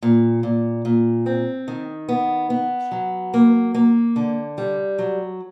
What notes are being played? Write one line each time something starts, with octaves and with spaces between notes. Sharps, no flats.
A#2
A#2
A#2
C4
D#3
B3
B3
F#3
A#3
A#3
D3
G3
F#3